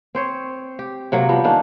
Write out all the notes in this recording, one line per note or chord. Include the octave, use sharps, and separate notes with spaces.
C4 C5 C#5
G4
C3 F#3 A#3
F3 G3 B3
D#3 A#3 C#4 D4